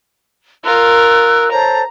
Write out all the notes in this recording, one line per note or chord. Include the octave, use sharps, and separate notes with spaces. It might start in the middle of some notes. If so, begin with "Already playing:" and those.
F4 A#4 E6 F#6
A4 C5 C#5 A#5